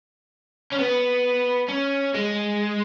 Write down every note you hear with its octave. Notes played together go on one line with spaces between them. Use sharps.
C#4
B3
C#4
G#3